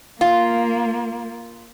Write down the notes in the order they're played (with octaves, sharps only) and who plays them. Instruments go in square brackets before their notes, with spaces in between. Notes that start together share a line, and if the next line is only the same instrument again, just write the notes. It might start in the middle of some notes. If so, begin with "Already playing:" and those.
[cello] A#3 [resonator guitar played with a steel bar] F4